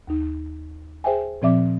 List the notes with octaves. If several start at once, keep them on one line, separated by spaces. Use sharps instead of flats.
D#2 D#4
G#4 C5 E5 G5 G#5
A#2 F3 C4 D5 E5 D6